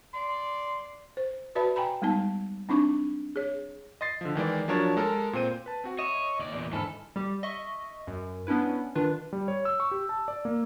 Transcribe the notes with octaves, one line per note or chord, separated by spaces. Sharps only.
D5 C6
C5
F#4 B4 D5 E5 A5 B5
G5 G#5 A#5 B5
G3 G#3 B3 D#4 A5
C4 D4 D#4 C#6 D6
G#4 C#5
D#5 C6 A6 C7
D3 F3
D#3 E3 G#3 D5
F3 F#3 D4 A#4 C#5 A6
G#3 A4 A#4
A#2 C4 C5 D#7
B4 A5
C4 F#4 F#5
C#5 D#5 E5 E7
D#2 D5
E2 A#2
G#2 D3 E3 A4 B5 F6
G3 G4
D#5 E5 C#6
F#2
B3 C#4 D4 E4 B4
D#3 D4 F4 B4
G3
C#5
E6
C#6
G4
A5
D5
A#3